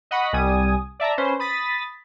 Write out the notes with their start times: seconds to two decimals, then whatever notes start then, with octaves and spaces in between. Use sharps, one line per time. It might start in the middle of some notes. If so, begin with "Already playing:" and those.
0.11 D#5 F#5 B5 C#6
0.33 C2 G3 G#5 D#6
1.00 D5 E5 A5 A#5
1.18 C#4 B4 C5
1.39 B5 D#6 A6 B6